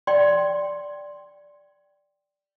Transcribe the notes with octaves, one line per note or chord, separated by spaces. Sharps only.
D5 G5 C6